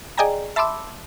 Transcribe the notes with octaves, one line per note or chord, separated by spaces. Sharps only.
G#4 D5 D#5 G5 G#5 A#5
E5 A5 B5 C6 D6 E6